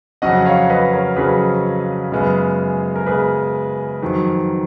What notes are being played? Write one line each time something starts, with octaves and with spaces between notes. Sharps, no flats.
F2 C#3 F#3 C#4 D#5 F#5
C#5 F5
B4 D#5
A#4 C#5
F2 C#3 F#3 C#4 G#4 B4
F#2 C#3 G#3 B3
A#4
F#2 C#3 G#3 B3 G#4 B4
F2 D#3 F#3